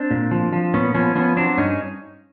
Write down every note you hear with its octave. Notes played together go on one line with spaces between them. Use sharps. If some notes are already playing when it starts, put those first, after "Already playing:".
Already playing: C4 D4
A#2
F3
F3
A#2 B3 C#4
F3 B3 C#4
F3 B3 C#4
F#3 C4 D4
G2 C#4 D#4